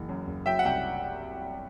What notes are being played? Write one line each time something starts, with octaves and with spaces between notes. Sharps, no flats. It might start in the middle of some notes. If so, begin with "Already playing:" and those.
Already playing: F#1 E3
F#2
F#1
F#3 E5 G5
F#5
C2 E5 G5